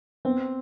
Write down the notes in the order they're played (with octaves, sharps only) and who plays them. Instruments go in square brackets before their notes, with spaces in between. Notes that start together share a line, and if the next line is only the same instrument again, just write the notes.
[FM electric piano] B3 [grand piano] C4